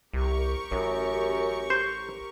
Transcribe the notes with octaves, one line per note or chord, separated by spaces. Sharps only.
C2 G4 A#4 C#6
A1 F#2
C5